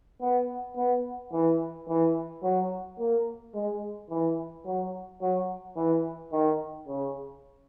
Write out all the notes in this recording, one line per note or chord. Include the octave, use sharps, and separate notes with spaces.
B3
B3
E3
E3
F#3
A#3
G#3
E3
F#3
F#3
E3
D#3
C#3